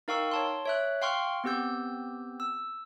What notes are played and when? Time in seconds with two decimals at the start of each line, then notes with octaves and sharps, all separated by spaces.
0.08 D#4 A#4 F5 G5 C#6 E6
0.31 C#5 A5 C6
0.65 C#5 E5 F#6
1.02 F5 G5 C6 C#6 F6
1.44 B3 C4 G4 E6 G6
2.40 E6